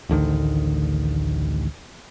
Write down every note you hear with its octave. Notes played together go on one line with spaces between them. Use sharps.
A1 D2 D3 D#3